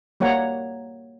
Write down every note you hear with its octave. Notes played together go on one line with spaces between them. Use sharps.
G3 A#3 C#5 F#5 A#5